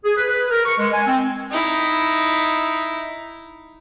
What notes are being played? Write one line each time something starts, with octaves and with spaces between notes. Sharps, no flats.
G#4
B4
B4
A#4
C#6
G#3
G#5
C4
D#4 E4